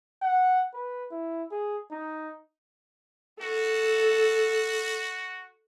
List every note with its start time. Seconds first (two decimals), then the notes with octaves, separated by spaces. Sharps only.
0.22 F#5
0.74 B4
1.11 E4
1.52 G#4
1.91 D#4
3.41 F#4 A4